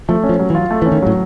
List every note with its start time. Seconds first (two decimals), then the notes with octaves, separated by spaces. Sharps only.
0.09 F3 A3
0.24 C#4
0.29 F3
0.39 F#3
0.50 E3
0.55 F4
0.71 A3
0.82 E3 C#4
0.92 D#3
1.02 A2 F#3